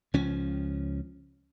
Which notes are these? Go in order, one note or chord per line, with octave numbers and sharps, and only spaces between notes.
C#2 F3 C#4